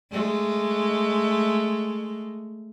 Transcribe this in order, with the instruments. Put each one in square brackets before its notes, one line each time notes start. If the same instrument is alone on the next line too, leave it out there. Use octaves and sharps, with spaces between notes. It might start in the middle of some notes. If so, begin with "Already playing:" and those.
[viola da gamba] G#3 A3